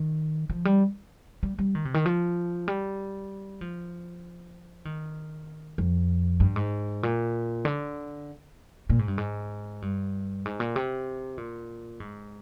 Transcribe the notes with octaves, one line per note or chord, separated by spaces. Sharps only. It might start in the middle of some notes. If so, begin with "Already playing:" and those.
Already playing: D#3
F3
G3
G3
G3
D#3
C3
D#3
F3
G3
F3
D#3
F2
G2
G#2
A#2
D3
A#2
G#2
G2
G#2
G2
G#2
A#2
C3
A#2
G#2